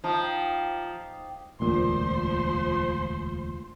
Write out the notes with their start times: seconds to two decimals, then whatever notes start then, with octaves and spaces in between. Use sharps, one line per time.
0.04 F3 D#4 G4
1.60 E1 D2 A#2 F3 C5 C6